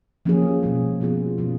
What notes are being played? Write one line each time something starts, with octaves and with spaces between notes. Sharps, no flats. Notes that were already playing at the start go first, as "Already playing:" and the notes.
F3 A#3 C#4 G#4
B2 G#3 C#4
F3 B3 F4 G#4
B2 F#3 A#3 C#4 F4